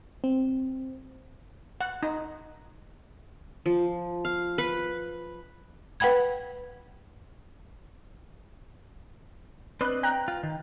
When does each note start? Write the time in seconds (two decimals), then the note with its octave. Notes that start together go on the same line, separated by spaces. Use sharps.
0.24 C4
1.81 F#5
2.03 D#4
3.66 F3
4.25 F5
4.58 B4
6.00 B4 F#5 G5 B5 G#6
9.81 C4 D4 B4 D#5 F#6
10.03 G5 A#5 F#6
10.28 F4
10.43 D#3